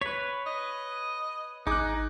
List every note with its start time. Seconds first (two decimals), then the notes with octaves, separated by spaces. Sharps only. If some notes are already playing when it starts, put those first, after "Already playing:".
0.01 B4 C#5 B6
0.46 D#5
1.67 G#1 D#4 G#4 D6 F#6